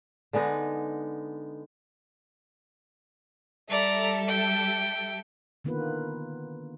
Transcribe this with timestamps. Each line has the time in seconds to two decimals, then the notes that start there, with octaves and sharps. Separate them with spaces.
0.33 D3 G#3 B3 D#4
3.70 G3 A4 D5 E5 A#5
4.28 G5
5.64 D3 D#3 A#3 B3 F4 B4